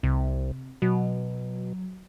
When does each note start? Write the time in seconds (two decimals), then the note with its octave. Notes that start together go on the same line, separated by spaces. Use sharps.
0.03 C2 C3
0.82 B2 F#3